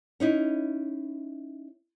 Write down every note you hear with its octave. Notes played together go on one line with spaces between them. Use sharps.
C#4 D#4 E4